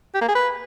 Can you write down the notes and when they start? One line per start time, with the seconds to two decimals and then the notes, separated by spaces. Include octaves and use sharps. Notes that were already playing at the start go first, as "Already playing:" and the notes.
0.14 G4
0.21 A#3
0.28 G#4
0.35 B4